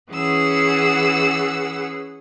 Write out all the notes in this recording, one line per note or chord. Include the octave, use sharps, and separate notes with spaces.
E3 C#4 G#4 B4 F#5 E6